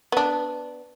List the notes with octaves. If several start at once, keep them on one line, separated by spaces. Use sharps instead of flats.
B3 D4